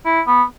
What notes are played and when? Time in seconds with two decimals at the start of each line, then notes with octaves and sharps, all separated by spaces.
0.05 E4
0.27 B3